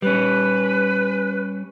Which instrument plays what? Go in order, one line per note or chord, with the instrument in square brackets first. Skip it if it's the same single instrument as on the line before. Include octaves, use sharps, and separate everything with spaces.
[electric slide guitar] G3 C#4 [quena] B4